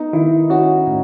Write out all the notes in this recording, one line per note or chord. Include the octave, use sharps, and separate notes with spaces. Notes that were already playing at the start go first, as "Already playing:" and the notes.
Already playing: B3 D#4
D#3 E4
C#4 F#4
A2